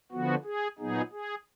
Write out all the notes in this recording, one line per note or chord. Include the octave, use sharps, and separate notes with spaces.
D3 F3 B3 F#4
G#4
A#2 F#3 B3 D#4 G#4
G#4